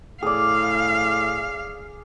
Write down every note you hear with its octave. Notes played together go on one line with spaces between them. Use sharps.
A2 G#4 D5 F5